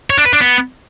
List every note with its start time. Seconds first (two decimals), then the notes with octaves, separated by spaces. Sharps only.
0.10 C#5
0.18 D4
0.25 B4
0.33 D4
0.40 B3